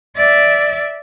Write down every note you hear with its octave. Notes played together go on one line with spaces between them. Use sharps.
D5 E5